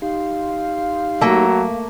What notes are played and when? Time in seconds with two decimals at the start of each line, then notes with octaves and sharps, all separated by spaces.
0.02 D#4 G4 F5 C6
1.21 F#3 A3 A#3